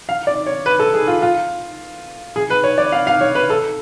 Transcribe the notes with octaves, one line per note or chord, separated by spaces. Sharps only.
F5
D5
C#5
B4
A4
G#4
F4
F4
G#4
B4
C#5
D5
F5
F5
C#5
B4
A4